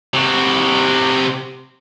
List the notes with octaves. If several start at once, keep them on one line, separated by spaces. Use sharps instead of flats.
C3 F#4